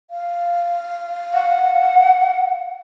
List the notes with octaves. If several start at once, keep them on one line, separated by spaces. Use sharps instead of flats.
F5
F#5